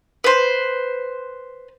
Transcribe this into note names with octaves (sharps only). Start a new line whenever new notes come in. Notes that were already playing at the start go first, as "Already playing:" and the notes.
B4 C5